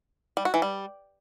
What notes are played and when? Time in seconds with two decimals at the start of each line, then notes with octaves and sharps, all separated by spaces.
0.37 G3
0.45 F#4
0.54 E3
0.62 G3